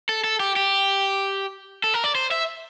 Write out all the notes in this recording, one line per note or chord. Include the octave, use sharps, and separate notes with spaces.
A4
A4
G4
G4
A4
A#4
D5
C5
E5